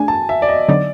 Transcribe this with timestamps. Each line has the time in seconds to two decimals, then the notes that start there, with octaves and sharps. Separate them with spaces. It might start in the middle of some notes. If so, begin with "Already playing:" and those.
Already playing: A3 D4 G#4 G#5
0.08 A5
0.29 E5
0.42 D5
0.49 D#5
0.68 D3 F#3 B3 D#4 D5